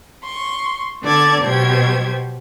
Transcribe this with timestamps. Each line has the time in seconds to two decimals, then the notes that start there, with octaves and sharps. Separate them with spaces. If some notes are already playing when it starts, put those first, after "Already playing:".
0.24 C6 C#6
1.02 D3 B3 D5 A5 G#6
1.44 B2 F#3 B3 G4 C5 G#6